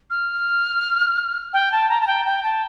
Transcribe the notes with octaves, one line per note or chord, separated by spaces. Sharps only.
F6
G5
A5
A#5
A5
G5
G5
A5